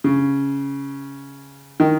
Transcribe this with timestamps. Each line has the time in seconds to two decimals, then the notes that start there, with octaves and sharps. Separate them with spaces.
0.04 C#3
1.80 D#3